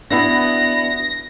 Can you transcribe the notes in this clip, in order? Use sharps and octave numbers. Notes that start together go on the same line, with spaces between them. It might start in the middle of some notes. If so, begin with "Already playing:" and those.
B3 D4 E4 F#4 A#6